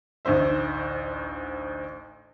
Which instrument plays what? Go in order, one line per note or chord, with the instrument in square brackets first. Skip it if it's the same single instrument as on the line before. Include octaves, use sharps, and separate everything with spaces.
[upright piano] A1 D2 D#4 C5 E5